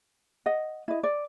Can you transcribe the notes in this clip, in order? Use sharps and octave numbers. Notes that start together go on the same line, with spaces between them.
D#5 F#5
E4 D#5
D5